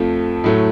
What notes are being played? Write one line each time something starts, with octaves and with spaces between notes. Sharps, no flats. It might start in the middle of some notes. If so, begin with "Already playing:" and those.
Already playing: F2 F3 A3
A2 F#3 A3